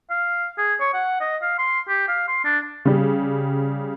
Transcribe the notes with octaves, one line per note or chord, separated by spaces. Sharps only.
F5
G#4
C#5
F#5
D#5
F5
C6
G4
F5
C6
D4
C#3 G3